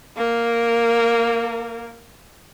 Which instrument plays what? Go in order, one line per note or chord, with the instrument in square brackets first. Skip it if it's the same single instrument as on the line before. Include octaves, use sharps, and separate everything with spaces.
[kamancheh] A#3 A#4